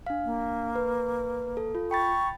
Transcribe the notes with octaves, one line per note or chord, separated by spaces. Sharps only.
D4 F5
A#3
B4
A4
F4
G5 B5 C#6 A6